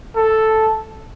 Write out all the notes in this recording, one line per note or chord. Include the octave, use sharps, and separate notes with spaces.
A4